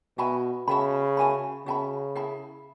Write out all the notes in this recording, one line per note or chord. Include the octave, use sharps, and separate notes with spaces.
B2 F#4 E5 G#5 B5
C#3 F#4 E5 G#5 B5
F#4 E5 G#5 B5
C#3 F#4 E5 G#5 B5
E4 G#4 E5 B5